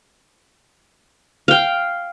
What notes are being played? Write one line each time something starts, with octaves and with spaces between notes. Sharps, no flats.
F5 G5